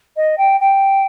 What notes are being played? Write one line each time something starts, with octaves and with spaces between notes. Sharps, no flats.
D#5
G5
G5